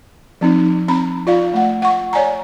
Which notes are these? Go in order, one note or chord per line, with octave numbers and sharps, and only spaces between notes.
F3 C4 D#4
C4 A#5 B5
F4 D5 F5
A3 F#5
F#5 C#6
C#5 D5 G#5 A#5